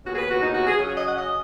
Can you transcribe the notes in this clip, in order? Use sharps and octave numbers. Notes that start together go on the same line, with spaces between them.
D#2 C#3 B3 F#4
G#4
B4
F#4
D#4
F#4
G#4
C#3 F#3 C#4
C#5
D#5
F#5
D#5